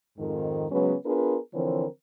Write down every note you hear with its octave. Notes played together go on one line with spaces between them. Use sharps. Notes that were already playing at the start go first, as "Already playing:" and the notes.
F2 G#2 D#3
C#3 F#3 G#3 B3 C#4 B4
B3 D4 F4 G#4 A#4 B4
D3 E3 F3 C4 A#4 C#5